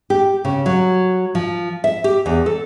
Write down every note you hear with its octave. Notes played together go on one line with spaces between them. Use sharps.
G4
C#3
F#3
F3
E5
G4
E2
A4